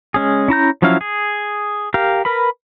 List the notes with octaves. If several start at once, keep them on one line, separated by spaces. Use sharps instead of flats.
G#3 C#4 G#4
C#4 E4 A#5 G6
F3 F#3 C#4 E4 F5
G#4
G4 A#4 F5
A#4 B4 B5